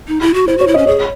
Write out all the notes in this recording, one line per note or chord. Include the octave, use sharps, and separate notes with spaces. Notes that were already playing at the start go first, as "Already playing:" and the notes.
D#4
E4
F#4
E4 C5
F#4 C#5
E4
D#5
C#4
G#4 C#5